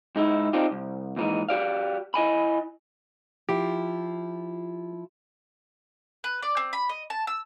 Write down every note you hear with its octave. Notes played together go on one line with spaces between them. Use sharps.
G#2 D#4 E4
C4 D4 D#4 F4 G4
C2
D#2 G#2 E3 D#4
F#4 G4 D5 F5
E4 D#5 G#5 B5
F3 E4 F4 G4
B4
D5
C4
B5
D#5
A5
E6